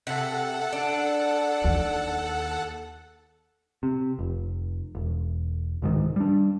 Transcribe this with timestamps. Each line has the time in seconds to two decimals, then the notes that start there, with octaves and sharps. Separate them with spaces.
0.07 C3 A4 E5 F#5
0.73 D4
1.64 D#2
3.83 C3
4.19 F1
4.95 E1
5.82 C2 G#2 D#3
6.16 G3 D4